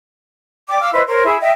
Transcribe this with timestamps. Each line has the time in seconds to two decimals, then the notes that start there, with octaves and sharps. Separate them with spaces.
0.67 D5 G5 D6
0.80 F5 D6 E6 F6
0.93 E4 B4 C5 D#5
1.06 A#4 C5 C#5
1.24 E4 G#4
1.40 D#5 E5 G5